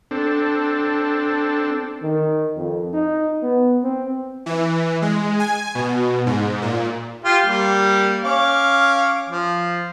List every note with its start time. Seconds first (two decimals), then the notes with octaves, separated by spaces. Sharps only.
0.11 C4 D4 A4
2.03 D#3
2.57 F2
2.94 D#4
3.43 B3
3.83 C4
4.46 E3
5.02 G#3
5.40 G#5
5.75 B2
6.26 G#2
6.62 A#2
7.24 F4 G4
7.45 G3 A#3
8.24 C#4 F5 D6
9.29 F3